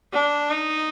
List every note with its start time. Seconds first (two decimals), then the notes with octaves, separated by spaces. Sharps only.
0.13 D4
0.50 D#4